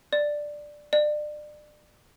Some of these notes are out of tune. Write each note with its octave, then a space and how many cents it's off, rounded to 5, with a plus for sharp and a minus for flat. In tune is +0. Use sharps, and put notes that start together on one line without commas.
D5 +5
D5 +30